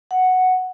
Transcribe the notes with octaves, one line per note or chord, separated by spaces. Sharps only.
F#5